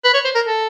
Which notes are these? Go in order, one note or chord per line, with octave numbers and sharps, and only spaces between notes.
B4
C#5
C5
A#4
A4